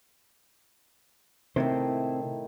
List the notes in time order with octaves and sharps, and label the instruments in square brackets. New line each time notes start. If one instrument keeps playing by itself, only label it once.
[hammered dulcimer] A2 D#3 G5 [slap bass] C3 [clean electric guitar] C4 E4 C5